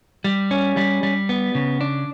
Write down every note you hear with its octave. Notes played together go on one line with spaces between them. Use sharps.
G3
C#4
G3
G3
B3
C#3
D4